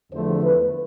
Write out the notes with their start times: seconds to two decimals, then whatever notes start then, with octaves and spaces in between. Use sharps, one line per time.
0.12 E2 D3 F3 A3 C5
0.42 B4